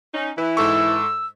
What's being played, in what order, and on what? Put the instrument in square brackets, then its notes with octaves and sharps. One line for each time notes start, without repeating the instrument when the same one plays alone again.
[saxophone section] C#4 D#4
[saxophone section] E3 E4 [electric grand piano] B4
[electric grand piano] G#2 A4 C#6 [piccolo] E6